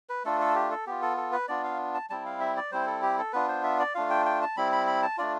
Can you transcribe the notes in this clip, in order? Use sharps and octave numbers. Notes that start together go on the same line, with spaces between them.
B4
A3 D4 F4 A4
A4
G4
A4
B3 F4 G4
A4
A4
B4
B3 D4 F4 D5
F5
A5
G3 C4 E4 A5
F5
E5
D5
G3 C4 E4 C5
A4
G4
A4
B3 D4 F4 B4
C5
E5
D5
A3 D4 F4 F5
G5
G5
A5
G3 C4 E4 B5
B5
B5
A5
A3 D4 F4 D5